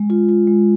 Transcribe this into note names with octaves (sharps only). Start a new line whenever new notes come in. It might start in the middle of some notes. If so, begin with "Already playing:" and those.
Already playing: G#3
F4
F4
G#3